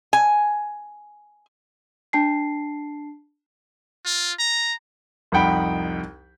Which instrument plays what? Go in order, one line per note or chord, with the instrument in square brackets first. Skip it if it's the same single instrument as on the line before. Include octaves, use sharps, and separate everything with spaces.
[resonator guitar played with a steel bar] G#5
[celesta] D4 A5 C7
[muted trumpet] F4
A#5
[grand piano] C2 F2 D#4 F#5 G5 B5